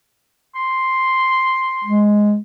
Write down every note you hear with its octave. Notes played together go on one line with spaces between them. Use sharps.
C6
G#3